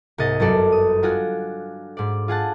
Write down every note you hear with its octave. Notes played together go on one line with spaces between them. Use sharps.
C2 G#2 G#4 D#5 A6 A#6
G1 F#2 F#4 A4 D5
D#6
D4 F4 F#4 G#5
G#2 D5
F4 G#4 F#5 A5